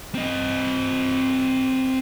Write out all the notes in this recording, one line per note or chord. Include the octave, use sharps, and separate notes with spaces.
C4 D#5